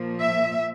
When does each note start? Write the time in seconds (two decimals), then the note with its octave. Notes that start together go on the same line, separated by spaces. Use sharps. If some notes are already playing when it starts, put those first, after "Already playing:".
Already playing: A#2 F3 A#3
0.20 E5